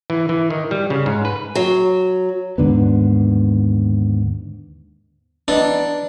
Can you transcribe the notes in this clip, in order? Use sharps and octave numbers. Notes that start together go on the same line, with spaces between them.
E3
E3
D#3
G3
C#3
G#2
B4
F#3
D#2 G#2 D3 B3
E3 B3 D4 D#4